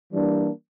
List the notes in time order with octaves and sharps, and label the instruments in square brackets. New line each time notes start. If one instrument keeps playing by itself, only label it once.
[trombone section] E3 G3 A#3 D4